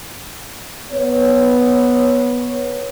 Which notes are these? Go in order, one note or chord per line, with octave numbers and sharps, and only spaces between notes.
B3 C#5